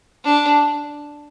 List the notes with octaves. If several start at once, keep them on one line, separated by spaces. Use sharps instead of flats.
D4